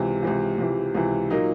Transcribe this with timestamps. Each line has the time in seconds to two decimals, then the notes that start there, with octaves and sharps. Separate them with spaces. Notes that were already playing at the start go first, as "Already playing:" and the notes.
Already playing: C#2 C3 E3
0.23 C#2 C3 E3
0.58 C#2 C3 E3
0.95 C#2 C3 E3
1.30 A#2 F#3 A#3 D#4